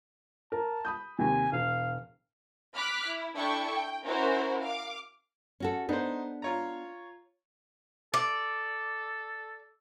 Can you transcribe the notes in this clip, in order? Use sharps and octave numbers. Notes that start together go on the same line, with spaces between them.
A#4 A5
B5 D#6 G6
D#2 C3 G#5
E1 F5
B5 D6 F6 F#6 B6
E4
D4 E4 A4 G5 C#6
G5
C#4 E4 F#4 A#4 C5
F5 D6
C#4 F#4 A4
B3 D4 D#4 C5
F4 C#5 A#5
A4 D5